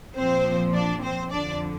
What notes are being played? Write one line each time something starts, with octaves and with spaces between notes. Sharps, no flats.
A#2 F3 C4 C5
D4 D5
C4 C5
F2 D3 F3 D4 D5